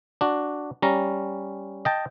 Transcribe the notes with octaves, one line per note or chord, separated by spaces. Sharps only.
D4 F#4
G3 C#4 A#5
D#5 G5 A5